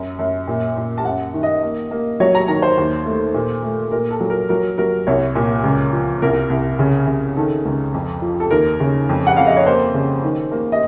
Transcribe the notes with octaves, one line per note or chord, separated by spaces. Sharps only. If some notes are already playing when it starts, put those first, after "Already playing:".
Already playing: F#2
F#2
A#2
A#2
A5
F#2 F#5
D#3
D#5
A#3
A#3
F#3 C#5
A#5
D#3 A#5
C5
D#2
A3
A#2
A3
A#2 A#4
A4
F#3
A#4
F#3 A#4
F#3 A#4
C2 C#5
A#2
C#2
F3
C2 A#4
C2
C#3
C#3
D#3 A4
C#2
F2
F3
A4
D#2 A#4
C#3
F2
F#5
F2 F5
D#5
C#5
A#3 C5
C#3
D#3
A#3
D#5